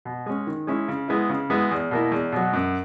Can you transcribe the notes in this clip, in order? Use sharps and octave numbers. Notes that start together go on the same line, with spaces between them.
B2
G#3 C#4
D#3
G#3 C#4 E4
C#3
G#3 B3 E4
C#3
G#3 B3 E4
E2
B2 A#3 E4
E2
B2 F#3
F#2